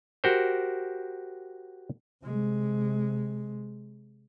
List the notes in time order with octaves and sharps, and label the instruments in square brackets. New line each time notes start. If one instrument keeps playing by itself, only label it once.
[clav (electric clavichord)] F#4 G4 A#4 C5
[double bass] C3 G#3